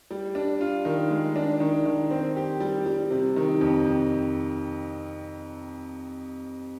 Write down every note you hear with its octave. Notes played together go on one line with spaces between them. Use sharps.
G3
D4
F4
D#3
G#3
D4
D#3
D#3
C4
G4
G3
G3
C3
D#3
F2
F2